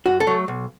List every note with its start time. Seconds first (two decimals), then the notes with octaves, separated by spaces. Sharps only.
0.06 F#2 F#4
0.20 A4
0.27 F#3 A3
0.48 B1